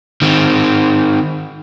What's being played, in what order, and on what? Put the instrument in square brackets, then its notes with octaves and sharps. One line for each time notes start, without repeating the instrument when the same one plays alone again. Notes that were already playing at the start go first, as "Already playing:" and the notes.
[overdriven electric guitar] D#3 C4